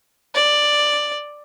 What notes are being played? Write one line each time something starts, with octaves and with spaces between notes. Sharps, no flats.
D5